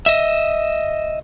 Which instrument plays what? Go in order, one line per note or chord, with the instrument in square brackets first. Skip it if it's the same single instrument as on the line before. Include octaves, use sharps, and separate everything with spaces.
[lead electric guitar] D#5 E5